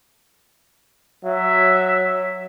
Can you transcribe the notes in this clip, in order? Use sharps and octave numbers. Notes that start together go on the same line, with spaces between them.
F#3 E5